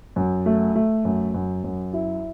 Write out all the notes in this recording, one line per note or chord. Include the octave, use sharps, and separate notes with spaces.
F#2
A3
A3
F#2
F#2
F#2
E4